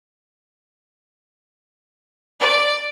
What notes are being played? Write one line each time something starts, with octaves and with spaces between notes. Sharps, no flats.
D5